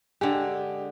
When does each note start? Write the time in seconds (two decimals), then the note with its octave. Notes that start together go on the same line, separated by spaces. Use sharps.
0.21 D3 G#3 G4